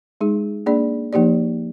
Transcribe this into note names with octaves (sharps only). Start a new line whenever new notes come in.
G#3 D#4 G#4
A#3 D4 G#4 D5
F3 A#3 D#4 G4 D5